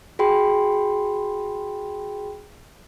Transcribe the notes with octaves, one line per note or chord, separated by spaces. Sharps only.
F#4 G#4 G5 B5 C6